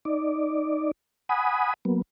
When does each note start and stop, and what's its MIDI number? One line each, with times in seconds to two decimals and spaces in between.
0.05 0.91 63
0.05 0.91 74
1.29 1.74 78
1.29 1.74 80
1.29 1.74 83
1.29 1.74 87
1.85 2.02 54
1.85 2.02 58
1.85 2.02 59